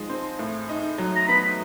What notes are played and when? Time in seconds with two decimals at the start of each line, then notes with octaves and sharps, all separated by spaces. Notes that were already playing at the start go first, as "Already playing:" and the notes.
Already playing: F3 G#3 D#4
0.09 C4
0.39 A2
0.69 D#4
0.98 F#3
1.16 A#5
1.28 B3 B5